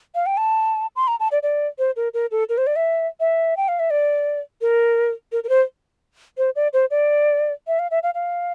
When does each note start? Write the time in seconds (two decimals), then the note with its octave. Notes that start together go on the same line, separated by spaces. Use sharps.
0.15 F5
0.26 G5
0.37 A5
0.96 C6
1.08 A#5
1.20 A5
1.32 D5
1.43 D5
1.79 C5
1.96 A#4
2.14 A#4
2.31 A4
2.49 A#4
2.58 C5
2.67 D5
2.76 E5
3.20 E5
3.57 G5
3.68 F5
3.79 E5
3.90 D5
4.61 A#4
5.32 A#4
5.44 A#4
5.49 C5
6.38 C5
6.56 D5
6.73 C5
6.91 D5
7.67 E5
7.79 F5
7.91 E5
8.03 F5
8.15 F5